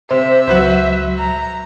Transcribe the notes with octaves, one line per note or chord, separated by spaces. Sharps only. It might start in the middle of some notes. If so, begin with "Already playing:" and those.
C3 C5 E5
C#2 F#3 F#4 B4 C5
A#5